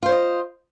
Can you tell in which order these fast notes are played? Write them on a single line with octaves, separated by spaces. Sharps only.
F4 C5 C#5 D#5